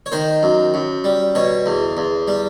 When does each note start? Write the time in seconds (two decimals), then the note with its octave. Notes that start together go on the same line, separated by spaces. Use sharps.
0.06 C#5
0.12 D#3 C5
0.43 F#2
0.74 F#2
1.04 G3
1.35 B2 C#5
1.66 E2
1.97 E2
2.28 G3